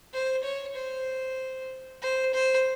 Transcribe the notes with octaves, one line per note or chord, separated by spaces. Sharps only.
C5
C#5
C5
C5
C5